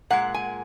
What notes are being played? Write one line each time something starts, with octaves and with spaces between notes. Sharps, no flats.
A#2 G#3 F#5
G#5